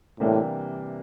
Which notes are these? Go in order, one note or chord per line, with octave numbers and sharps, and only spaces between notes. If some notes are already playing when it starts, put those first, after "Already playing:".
A2 C3 E3 G3 A#3 D4